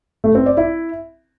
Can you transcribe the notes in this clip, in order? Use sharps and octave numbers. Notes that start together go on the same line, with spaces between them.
A3
C4
D5
E4